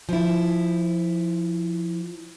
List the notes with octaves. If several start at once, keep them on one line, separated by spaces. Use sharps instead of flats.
F3 E4